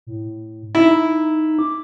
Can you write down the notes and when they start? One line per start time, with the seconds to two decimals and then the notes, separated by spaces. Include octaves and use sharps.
0.07 A2
0.75 D#4 E4
1.59 D6